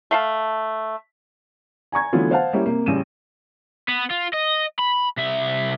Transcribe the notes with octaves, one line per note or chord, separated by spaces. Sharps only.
A3 F5 A5
G#5 A#5 C#6 G#6
D3 E3 F#3 A3 B3 F4
C5 F5 F#5 A5
G3 A#3 C#4 E4 G4
C3 A#3
A1 C#3 G3 D#7 E7
B3
F4
D#5
B5
C2 E5